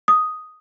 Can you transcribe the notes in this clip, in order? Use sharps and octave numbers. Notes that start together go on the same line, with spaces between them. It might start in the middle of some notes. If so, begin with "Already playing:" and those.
D#6